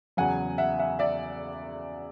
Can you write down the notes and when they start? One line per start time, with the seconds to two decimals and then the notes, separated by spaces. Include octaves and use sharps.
0.17 E2 C#3 F#3 F#5 G#5
0.58 E5 F#5
0.79 E5 F#5
0.99 D5 E5